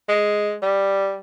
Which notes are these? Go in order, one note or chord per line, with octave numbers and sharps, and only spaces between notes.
G#3
G3